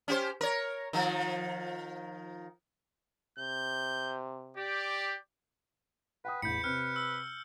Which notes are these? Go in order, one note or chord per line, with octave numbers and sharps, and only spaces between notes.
C#4 G4 C5
A#4 C#5
D#3 F3
C3 G6
G4 D5
B4 F#5 G5 D#6
A1 E2 B5 G6 C#7
C3 C4 B4 F6
E6